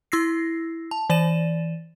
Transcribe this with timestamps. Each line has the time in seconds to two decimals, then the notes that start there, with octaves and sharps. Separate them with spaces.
0.12 E4 E6 A#6 C7
0.91 A5
1.10 E3 D5 A6 D#7 E7